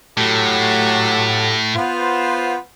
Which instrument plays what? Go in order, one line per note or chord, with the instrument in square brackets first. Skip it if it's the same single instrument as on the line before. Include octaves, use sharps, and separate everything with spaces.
[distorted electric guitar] A2 [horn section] F#3 G4 A4
[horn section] B3 F4 C5